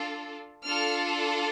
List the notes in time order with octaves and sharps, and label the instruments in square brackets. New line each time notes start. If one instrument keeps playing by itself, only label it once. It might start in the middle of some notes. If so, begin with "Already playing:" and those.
Already playing: [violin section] D4 F4 A4
D4 F4 A4 F6